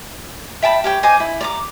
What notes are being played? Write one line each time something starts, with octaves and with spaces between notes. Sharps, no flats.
E5 G5 A5 B5
G4 C#5 G5
C5 D#5 G#5 D6
E4
D5 A#5 D6